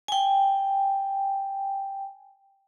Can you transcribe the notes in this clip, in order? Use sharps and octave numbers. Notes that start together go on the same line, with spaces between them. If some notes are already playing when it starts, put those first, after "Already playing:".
G5 G#5